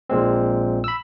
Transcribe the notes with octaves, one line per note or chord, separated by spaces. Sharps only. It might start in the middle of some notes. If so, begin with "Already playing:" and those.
A#1 A#2 G#3 C4
B5 E6